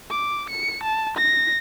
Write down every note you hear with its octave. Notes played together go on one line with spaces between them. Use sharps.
D6
C#7
A5
A#6